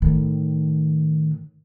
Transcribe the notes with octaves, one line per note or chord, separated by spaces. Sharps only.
A2 D#3